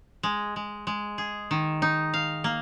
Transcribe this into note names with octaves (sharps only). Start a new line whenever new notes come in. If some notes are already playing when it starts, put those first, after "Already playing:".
G#3
G#3
G#3
G#4
D#3
D#4
F5
A#3